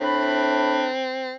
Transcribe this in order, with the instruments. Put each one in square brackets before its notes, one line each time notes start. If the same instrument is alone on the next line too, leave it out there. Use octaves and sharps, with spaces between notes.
[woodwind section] A2 D4 B5 [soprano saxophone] C4